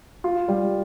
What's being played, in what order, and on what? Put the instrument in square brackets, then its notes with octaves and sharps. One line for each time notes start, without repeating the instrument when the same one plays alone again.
[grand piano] F4
G3